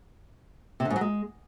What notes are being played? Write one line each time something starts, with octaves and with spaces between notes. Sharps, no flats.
C3
D3
G#2
F#3
G#3